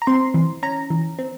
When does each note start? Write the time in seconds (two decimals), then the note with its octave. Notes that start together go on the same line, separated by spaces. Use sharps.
0.02 A#5
0.07 C4 C6
0.34 E3
0.63 C#4 A#5
0.90 E3
1.19 C4